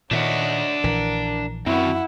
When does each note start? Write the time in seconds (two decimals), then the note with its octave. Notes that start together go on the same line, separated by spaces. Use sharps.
0.11 A#2 D#3 D4 C#5 D#5 E5 F#5
0.84 A#1 E3 A#4
1.66 F#2 C4 E4 F#4 F#5